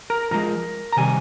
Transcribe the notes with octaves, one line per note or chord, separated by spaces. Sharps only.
A#4 A#5
G2 F3 G#3 A#4 A#5
A#5
C3 D#3 G3 G#5